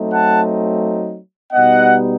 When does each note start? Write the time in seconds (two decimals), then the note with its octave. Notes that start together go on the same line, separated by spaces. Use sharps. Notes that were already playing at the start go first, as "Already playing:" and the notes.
Already playing: F#3 A3 C4 D#4
0.12 F#5 A5
1.52 B2 G3 B3 D#4 D#5 F#5